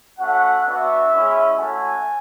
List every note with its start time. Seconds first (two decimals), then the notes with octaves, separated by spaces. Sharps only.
0.19 A3 C#4 F#4 F#5
0.66 B3 D4 F#4 E5
1.11 G#3 C#4 E4
1.57 A3 C#4 F#4 G#5